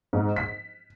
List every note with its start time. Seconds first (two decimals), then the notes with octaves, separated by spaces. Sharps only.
0.13 G#2
0.36 B6